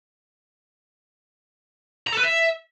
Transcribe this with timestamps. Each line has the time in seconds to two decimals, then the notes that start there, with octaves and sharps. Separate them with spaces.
2.07 A#5
2.12 A4
2.18 B4
2.23 E5